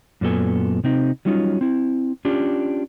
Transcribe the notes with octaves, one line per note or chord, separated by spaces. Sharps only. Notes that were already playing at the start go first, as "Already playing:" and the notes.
F#2 A#2 B3 A4 G#5
C3 C4 D#4
F#3 G3 C#4 D#4 F4
C4 E4
C#4 D4 F4 G4